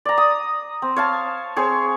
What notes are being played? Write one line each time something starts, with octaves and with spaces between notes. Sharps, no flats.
D5 A#5
D#6
C4
C#5 F5 A5
C4 G#4 C#5